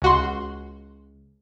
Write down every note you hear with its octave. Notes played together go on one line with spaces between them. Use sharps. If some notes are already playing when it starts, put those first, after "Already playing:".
C#2 F#4 C6